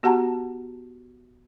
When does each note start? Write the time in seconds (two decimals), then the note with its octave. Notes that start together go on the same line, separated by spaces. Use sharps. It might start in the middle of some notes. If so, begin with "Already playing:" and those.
0.03 B3 F#4 G4 F#5 A5 A#5